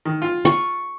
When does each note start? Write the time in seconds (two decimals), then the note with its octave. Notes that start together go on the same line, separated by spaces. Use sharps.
0.05 D#3
0.22 F4
0.45 C#6